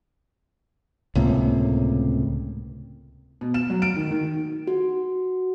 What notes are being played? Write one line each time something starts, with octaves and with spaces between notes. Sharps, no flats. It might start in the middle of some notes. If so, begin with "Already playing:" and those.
C#2 A2 C3 A#3
B2
E7
F#3
D7
D#3
D#3
F#4